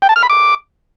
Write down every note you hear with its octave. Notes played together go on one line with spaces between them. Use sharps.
G5
A5
F6
B5
D6